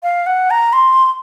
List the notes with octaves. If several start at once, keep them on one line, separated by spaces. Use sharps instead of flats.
F5
F#5
A#5
C6